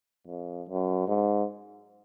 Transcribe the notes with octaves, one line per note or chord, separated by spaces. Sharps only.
F2
F#2
G#2